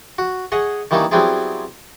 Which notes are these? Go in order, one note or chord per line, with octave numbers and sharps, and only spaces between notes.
F#4
G#4 C#5 D#5 F#5
D#3 E3 G3 A#3 C#4 D#4
F#3 G3 B3 C4 E4 G#4